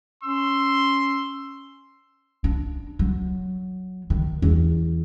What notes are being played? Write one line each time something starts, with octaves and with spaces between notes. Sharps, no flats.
C#4 C6 E6
D4
F#3
D#3
E2